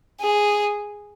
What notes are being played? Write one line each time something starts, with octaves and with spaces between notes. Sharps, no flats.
G#4